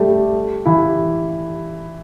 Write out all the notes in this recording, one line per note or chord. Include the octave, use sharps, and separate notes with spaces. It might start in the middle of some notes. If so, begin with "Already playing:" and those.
Already playing: G3 A3 G4 A4
E3 E4